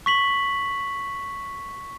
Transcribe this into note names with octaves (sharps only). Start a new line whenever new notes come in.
C#6 B6 F#7